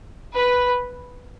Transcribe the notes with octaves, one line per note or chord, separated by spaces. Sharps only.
B4